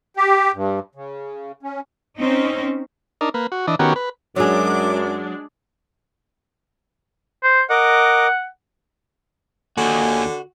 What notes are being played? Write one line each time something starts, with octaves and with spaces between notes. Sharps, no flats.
G4
G2
C#3
C#4
C4 C#4 D#4
D4 D#4 A#4
A#3 B4
F#4
E3 D4 D#5
D#3 B3 C#4 F#4 G4 A#4
B4
F#2 F#3 G#3 D4 G#4 D5 D6
C5
A#4 D#5 F#5 D6
D#2 D3 F#4 G#5